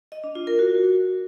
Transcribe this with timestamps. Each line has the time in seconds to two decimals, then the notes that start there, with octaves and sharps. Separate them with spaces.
0.12 D#5
0.24 D4
0.35 F4
0.47 A#4
0.59 F#4